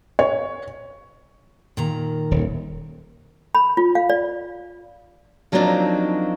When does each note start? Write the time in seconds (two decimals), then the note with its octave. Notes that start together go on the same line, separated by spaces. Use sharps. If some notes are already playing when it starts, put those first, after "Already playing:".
0.19 C#5
1.77 A#2 D#3 A#5
2.31 D#1
3.55 B5
3.77 F4
3.95 F5
4.10 D5
5.52 F3 F#3 A#3 C4 D4 D#4